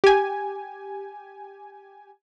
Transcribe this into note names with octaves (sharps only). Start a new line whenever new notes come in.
G4 G#5